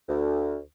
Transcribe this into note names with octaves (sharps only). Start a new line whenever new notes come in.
D2